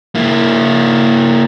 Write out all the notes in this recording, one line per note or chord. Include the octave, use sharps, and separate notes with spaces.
A#3 E4